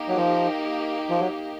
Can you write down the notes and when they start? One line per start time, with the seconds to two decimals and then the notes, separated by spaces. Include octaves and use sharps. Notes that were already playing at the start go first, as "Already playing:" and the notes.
Already playing: A#3 D#4 G4
0.09 F#3
0.16 F3
1.10 F3
1.20 F#3